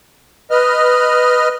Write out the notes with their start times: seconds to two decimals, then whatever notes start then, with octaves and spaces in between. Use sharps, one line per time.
0.51 B4 D#5 F6